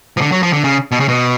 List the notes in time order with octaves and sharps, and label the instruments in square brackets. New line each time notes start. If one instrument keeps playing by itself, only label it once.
[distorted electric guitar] F3
D3
F#3
F3
D3
C#3
B2
C#3
B2